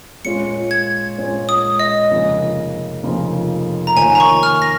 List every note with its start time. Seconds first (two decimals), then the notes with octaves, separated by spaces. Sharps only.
0.24 A#2 G#3 C#4 F4 C#5 C#7
0.71 G#6
1.18 A#2 G#3 C#4 F4 C#5
1.49 D#6
1.79 D#5
2.10 F1 F2 C#3 A#3 F4
3.03 F1 F2 C#3 A#3 F4
3.87 A#5
3.96 D#2 D#3 A#3 F4 C#5 G#5
4.15 A#5
4.20 C#6
4.43 F6
4.62 A#6